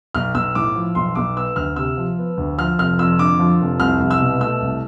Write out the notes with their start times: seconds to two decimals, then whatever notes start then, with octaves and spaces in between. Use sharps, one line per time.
0.15 B1 F6
0.34 B1 E6
0.55 A2 D6
0.76 F3
0.95 B1 C6
1.15 B1 D6
1.37 B3 E6
1.56 D2 F6
1.76 C3 E6
1.97 F3
2.18 B3
2.37 D2
2.58 F3 F6
2.78 F1 F6
2.99 F2 E6
3.19 D3 D6
3.39 F3
3.60 F1
3.80 C2 F6
4.00 C2
4.11 E6
4.20 B2
4.41 A3 E6
4.61 C2